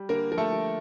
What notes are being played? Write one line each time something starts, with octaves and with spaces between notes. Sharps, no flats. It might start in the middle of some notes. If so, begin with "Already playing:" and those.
Already playing: G3
D3 A#3 A#4
F3 A#4
A3 A4
F3